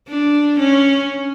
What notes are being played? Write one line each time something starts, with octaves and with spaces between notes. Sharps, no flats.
D4
C#4